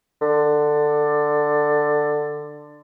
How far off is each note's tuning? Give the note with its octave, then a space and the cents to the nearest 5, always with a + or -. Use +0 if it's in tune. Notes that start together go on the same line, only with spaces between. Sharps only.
D3 +15